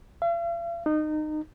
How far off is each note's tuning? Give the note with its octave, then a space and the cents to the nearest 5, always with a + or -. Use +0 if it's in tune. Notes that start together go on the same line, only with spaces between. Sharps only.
F5 -45
D#4 -25